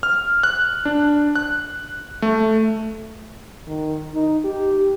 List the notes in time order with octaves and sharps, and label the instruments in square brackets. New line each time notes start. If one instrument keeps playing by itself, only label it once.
[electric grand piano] F6
F#6
D4
F#6
A3
[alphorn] D#3
D#4
G4